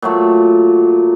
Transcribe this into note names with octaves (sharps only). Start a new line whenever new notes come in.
A#2 F#3 A3